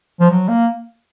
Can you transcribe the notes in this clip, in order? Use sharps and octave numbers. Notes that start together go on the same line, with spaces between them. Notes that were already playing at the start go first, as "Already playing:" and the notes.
F3
F#3
A#3